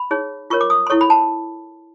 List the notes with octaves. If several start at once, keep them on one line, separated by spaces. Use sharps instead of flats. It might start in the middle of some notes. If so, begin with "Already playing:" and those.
Already playing: B5
D#4 G#4 C#5
F4 A#4 C#5 C#6
D6
D#6
C6
E4 A4 C#5 C#6
B5
A5